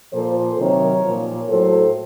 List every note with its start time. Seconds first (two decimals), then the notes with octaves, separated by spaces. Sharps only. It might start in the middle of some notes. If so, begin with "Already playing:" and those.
0.13 A#2 F3 A4 C5
0.58 C3 D#3 F#3 A#4 C#5
1.03 A#2 F3
1.49 A2 F#3 A4 C5